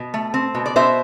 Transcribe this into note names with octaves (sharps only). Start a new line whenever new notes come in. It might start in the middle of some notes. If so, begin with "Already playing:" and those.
Already playing: B2
A3
C4
B2
D5
B2 C5 E5